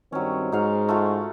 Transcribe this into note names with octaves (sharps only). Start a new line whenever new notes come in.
G2 D#3 F#3 C4 C#4
G#2 D#4 F#4 F5
A3 F4 F#4